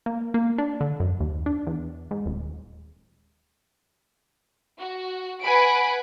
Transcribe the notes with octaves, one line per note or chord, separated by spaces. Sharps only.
A#3
A#3
D4
D3
F#2
D#2
D4
E2
G#2
D#1
F#4
B4 F#5 G#5 B5 D7